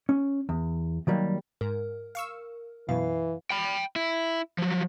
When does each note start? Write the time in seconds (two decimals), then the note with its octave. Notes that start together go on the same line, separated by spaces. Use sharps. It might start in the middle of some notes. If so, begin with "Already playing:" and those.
0.09 C#4
0.49 E2
1.07 D#3 F#3 G3 A#3
1.61 G#2 A#4
2.15 F5 C#6 E6
2.89 F#2 B2 E3 F5
3.51 G5 B5
3.96 E4
4.58 F3 F#3